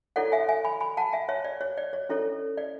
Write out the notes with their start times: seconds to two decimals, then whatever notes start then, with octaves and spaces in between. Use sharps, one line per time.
0.16 E4 A4 C#5 D5 F#5
0.32 E5 G#5
0.49 E5 G#5
0.64 G#5 B5
0.80 G#5 B5
0.97 F#5 A5
1.13 E5 G#5
1.29 C#5 E5
1.44 D5
1.61 C#5
1.78 D5
1.93 C#5
2.09 C#4 E4 A4 C#5
2.57 D5